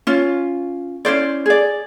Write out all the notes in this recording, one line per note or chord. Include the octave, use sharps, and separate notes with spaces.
C#4 F4
C#4 E4 C5 D5
G#4 D5